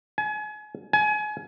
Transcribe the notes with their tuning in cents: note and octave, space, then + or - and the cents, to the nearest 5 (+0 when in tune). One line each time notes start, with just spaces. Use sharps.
G#5 +35
G#5 +30